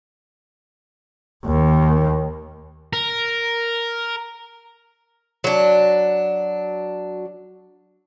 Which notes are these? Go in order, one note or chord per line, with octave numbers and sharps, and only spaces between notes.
D#2
A#4
F#3 D4